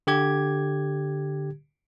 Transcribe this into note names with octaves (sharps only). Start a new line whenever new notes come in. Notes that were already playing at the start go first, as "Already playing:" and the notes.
D3 G4 G#6